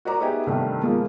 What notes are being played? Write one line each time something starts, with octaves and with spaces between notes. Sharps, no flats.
F#4 A#4 D5 D#5 A#5 D6
B3 D#4 G4 G#4 D#5 E5
C2 G2 D#3 A3
F3 G#3 A#3